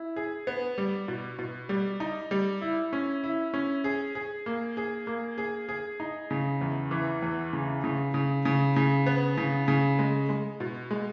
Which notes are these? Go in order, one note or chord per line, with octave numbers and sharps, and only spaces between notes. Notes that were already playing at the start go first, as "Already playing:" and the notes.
Already playing: E4
G#4
B3
G3
B2
B2
G3
D#4
G3
E4
C#4
E4
C#4
G#4
G#4
A#3
G#4
A#3
G#4
G#4
D#4
C#3
E2
E3
E2
C#3
C#3
C#3
C#3
C#3
B3
C#3
C#3
G#3
G#3
B2
G#3